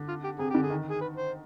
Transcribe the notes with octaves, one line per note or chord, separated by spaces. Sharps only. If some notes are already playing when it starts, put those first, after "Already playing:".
Already playing: D3
F4
G4
C3 G#4
D3 G4
G#4
D#3
G#4
B4
C5